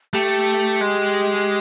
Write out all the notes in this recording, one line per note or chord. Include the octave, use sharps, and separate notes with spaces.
A3 G4
G#3